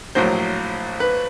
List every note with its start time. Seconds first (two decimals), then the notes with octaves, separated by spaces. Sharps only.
0.15 A#1 A2 F#3 C5
1.00 B4